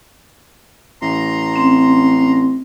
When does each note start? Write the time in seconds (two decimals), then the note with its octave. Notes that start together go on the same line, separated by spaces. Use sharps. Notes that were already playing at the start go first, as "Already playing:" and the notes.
1.02 A1 A#5 C6
1.54 C4 C#4